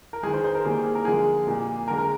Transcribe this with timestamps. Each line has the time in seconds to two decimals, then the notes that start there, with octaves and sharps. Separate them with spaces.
0.13 A#4
0.23 G#3 G#4
0.27 D#3
0.34 C5
0.44 C5
0.55 A#4
0.65 D#3 G3 A#3 G#4
0.85 G#4
0.95 A#4
1.05 D3 F3 G#3 G#4
1.47 A#2 G3 A#3
1.88 D3 G#3 A#4
1.98 A#4